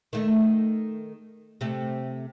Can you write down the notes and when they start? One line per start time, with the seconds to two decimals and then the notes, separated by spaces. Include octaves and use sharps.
0.13 D#3 A3
1.61 C3 A3